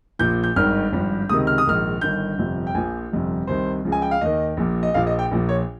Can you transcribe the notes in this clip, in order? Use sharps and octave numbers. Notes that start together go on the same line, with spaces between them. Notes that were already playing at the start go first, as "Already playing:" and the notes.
A#1 A#2 F3 G6
G6
G#1 G2 D#3 F6
G#1 G2 F3
C#2 C3 D#3 D#6
F6
D#6
A#1 G#2 D#3 F6
G1 G2 D#3 G6
G1 F2 C3 F3
G5
A#1 A#2 F3 G#5
G1 F2 C3
C2 C3 D#3 C5
C#2 C#3 F3
G#5
G5
F5
D#2 D#3 D#5
A#1 A#2 F3
D#5
A#1 A#2 F3 F5
D#5
G5
A#1 A#2 F3
C#5